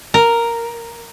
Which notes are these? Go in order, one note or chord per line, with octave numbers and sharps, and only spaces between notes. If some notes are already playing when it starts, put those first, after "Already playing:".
A#4